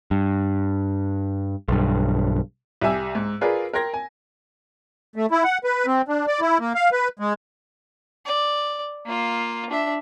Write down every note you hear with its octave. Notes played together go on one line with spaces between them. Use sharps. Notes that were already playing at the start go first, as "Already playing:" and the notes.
G2
B1 G2
C2 G4 E5 G#5 E6
G#2
F4 G#4 A#4 B4 D5
A#4 G5 C6 G#6 A#6
G#5
A3
E4
F#5
B4
C4
D4
D5
E4
A#3
F5
B4
G#3
D5
A#3 F4
D4 E5